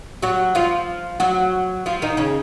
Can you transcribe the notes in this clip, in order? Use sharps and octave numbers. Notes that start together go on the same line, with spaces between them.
F#3 F#4
F3 F4
F#3 F#4
F3 F4
D#3 D#4
C#3 C#4